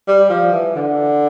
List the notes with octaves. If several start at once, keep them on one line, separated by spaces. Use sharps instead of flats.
G3
F3
E3
D3